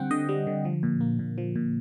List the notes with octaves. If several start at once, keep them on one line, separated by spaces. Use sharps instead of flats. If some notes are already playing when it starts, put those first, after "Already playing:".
Already playing: D3 G3 C4 F#5 G5
D3 D#5
G3
D3
F3
A#2
A#3
A#2
F3
A#2